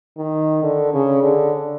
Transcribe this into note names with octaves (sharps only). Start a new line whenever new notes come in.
D#3
D3
C#3
D3